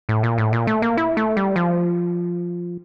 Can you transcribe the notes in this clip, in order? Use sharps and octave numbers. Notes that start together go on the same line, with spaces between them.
A2
A#2
A2
A#2
A3
A#3
E4
A3
G3
F3